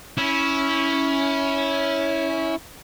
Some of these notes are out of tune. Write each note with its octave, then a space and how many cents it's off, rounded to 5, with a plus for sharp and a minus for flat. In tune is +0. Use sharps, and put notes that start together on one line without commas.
C#4 +5 E4 -15